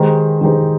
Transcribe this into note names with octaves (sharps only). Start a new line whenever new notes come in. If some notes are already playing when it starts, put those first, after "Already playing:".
Already playing: D#3 G#3 D#4 G4 C5
D#3 G#3 D#4 G4 C5